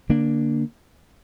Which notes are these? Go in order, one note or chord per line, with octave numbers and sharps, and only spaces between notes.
D3 A#3 D4